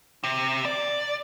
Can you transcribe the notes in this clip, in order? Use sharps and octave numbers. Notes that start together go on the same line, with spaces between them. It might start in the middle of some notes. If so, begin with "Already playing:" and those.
C3
D5